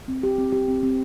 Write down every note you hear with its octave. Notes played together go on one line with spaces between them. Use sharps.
C4
G4
C4
G4
C4
C4